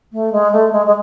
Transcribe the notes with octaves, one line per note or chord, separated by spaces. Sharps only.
A3
G#3
A3
G#3
G#3